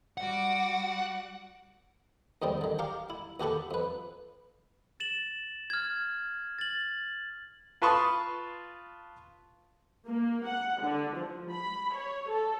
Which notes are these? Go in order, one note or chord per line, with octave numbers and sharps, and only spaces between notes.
G3 F#4 F#5 D6
D#2 G#2 G3 C4
D3 D#3
G4 F5 A#5 C#6
E4
D#2 F#4 G4 A4 B5 C#6
F2 B4
A6 E7 F#7
F6 G#6
A6 F#7
F4 B4 A5 C6 C#6 D#6
A#3
F#5
D3
F3
B5
C#5
A4